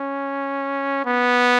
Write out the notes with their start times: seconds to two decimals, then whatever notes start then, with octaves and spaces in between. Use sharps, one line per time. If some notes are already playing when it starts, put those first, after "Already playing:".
Already playing: C#4
1.05 B3